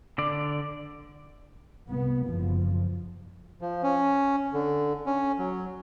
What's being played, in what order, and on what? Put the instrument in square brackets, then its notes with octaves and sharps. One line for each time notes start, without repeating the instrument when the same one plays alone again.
[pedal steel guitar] D3 D5
[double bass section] C2 B3
F#1 F3
[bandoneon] F3
C#4
D3
C#4
F#3